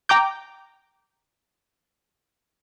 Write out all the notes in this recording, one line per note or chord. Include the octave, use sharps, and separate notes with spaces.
G5 A#5 D6 G6